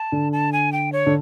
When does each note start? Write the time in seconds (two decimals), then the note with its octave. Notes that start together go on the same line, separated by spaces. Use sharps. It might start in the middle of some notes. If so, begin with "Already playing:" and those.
Already playing: A5
0.12 D3
0.33 A5
0.53 G#5
0.72 G5
0.92 C#5
1.06 D3